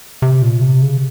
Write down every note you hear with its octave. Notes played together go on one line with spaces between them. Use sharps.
C3
A#2
C3
C#3